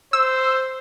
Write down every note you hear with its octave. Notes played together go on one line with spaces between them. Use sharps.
C5 E6